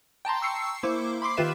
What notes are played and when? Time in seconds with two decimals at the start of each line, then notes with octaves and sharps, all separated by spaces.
0.25 G5 A5 A#5 C6
0.42 C#6 E6 C7 C#7
0.83 A#3 E4 C5 D6
1.22 B5 C6 D6 C7
1.37 D#3 F4 G4 B4 E5 E7